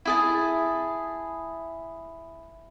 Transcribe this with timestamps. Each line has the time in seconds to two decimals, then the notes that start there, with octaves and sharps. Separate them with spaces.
0.05 E4 G#4 A5